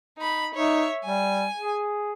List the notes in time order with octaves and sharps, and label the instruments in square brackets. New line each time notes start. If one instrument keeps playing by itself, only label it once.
[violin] D#4 B5
[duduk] D#4 [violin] C#5 E5
[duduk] G3 [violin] G#5
[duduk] G#4